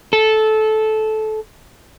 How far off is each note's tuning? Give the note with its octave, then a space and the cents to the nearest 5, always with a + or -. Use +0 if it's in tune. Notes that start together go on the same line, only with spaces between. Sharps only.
A4 -15